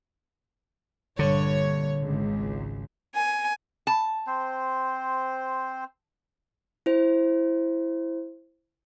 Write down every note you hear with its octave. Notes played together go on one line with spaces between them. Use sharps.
A#1 G2 D3 C#5
G#1 C#2
G#5
A5
C4 C5
E4 C5